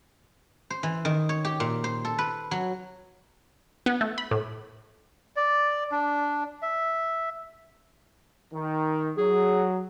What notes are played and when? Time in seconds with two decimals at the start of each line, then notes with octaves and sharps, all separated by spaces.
0.70 C5
0.83 E3
1.05 D#3
1.29 C#5
1.45 G4
1.60 A#2
1.84 C5
2.05 A4
2.18 B4
2.51 F#3
3.86 B3
4.01 A3
4.18 B5
4.31 A2
5.36 D5
5.92 D4
6.62 E5
8.54 D#3
9.18 F#3 G#4